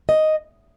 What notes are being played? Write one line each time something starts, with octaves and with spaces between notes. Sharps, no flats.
D#5